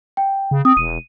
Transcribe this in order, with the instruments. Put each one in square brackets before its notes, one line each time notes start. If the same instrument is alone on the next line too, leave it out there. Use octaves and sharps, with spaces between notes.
[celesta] G5
[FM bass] C#3
[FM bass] C4 [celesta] D#6
[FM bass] E1 [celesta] D#7